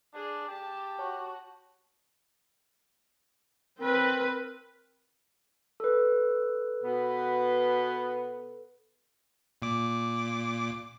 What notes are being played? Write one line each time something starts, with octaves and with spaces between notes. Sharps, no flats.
D4 G#4
G4 A5
F#4 C#5 A5 C#6
C4 A#4 B4
A4 B4
B2 B3
A#2 D6